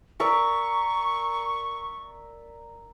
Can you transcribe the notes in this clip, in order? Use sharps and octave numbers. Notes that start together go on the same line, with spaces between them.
A#4 D5 E5 C#6